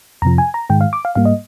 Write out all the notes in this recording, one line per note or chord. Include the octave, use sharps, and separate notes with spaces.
F2 C3 F3 A#5
G#5
A#5
G#2 D#3 G#3 G5
F5
D6
F5
G#2 G3 A#3 F5
D#5